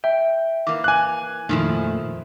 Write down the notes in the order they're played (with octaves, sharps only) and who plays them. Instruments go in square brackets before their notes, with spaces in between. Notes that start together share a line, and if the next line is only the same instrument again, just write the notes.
[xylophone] E5 [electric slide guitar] G5
[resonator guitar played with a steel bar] E3 A#3 [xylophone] D6
[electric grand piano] G#5 F#6
[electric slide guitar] F2 A#2 A3 [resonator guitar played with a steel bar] D#3 F3 E4